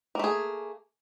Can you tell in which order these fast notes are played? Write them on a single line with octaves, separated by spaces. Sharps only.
A#3 A3 G#4